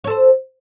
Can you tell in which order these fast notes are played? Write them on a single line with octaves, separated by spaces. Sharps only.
C#5 A4 C5